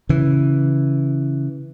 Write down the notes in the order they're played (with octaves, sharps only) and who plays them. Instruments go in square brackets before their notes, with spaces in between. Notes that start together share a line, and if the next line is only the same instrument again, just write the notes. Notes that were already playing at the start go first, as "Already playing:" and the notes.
[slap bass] C#3 E3